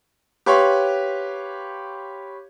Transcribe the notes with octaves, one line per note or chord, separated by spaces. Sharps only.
G4 B4 C#5 F5 C6 C#6